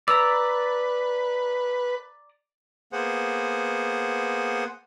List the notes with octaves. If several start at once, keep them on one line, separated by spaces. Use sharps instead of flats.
B4 D5 A#5 E6
A#3 B3 G#4 C5 F#5